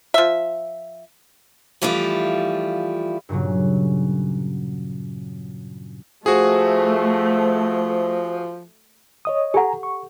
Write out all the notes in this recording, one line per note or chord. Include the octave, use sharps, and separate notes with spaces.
F3 E5
E3 F3 G3 A3 E4 F4
G2 A#2 C#3 F#3
F3 A3 F#4 G#4 C5
C#5 D#5 D#6
G4 A4 F#5 G#5 A#5
C#6